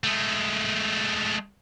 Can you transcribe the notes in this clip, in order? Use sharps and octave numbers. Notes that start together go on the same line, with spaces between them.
G#3 A3